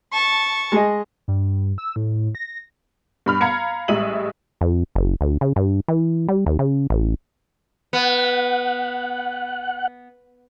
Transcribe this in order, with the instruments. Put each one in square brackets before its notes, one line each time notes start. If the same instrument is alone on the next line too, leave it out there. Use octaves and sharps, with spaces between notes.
[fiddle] A5 C#6
[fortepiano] G#3 G#4 D#5
[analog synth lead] G2
E6
A2
A#6
[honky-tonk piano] G2 B5 F6
F5 A#5 B5 G#6 C#7
A1 G3 G#3 E5 D#7 F#7
[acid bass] F2
F#1
D2
C#3
G2
E3
G3
D#2
C#3
A1
[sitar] B3 [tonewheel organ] F#5